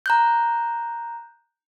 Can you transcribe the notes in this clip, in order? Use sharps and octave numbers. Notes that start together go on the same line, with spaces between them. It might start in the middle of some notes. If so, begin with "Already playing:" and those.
A#5 F#6 G6